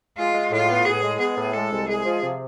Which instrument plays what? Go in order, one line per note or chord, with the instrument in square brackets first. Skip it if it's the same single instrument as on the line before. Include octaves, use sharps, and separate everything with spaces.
[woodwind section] G#3 [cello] F4
[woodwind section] G#3
[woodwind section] A2 [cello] F4
[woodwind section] B3
[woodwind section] A2 [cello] G#4
[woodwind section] G#3
[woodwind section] B3 [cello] G#4
[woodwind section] A2
[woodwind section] G#3 [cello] A4
[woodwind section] C2
[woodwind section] G#3 [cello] G#4
[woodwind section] F3
C3